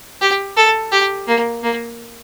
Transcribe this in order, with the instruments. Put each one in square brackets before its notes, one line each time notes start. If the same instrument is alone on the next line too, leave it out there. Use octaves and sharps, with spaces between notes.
[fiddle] G4
A4
G4
A#3
A#3